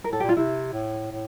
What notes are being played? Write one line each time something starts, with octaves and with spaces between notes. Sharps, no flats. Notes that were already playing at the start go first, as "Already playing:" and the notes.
A#4
A2 A4
A#2 G4
F4
C3 E4
A2
A2